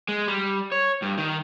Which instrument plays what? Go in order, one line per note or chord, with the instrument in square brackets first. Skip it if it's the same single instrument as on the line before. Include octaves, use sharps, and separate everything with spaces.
[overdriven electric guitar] G#3
G3
C#5
G2
D#3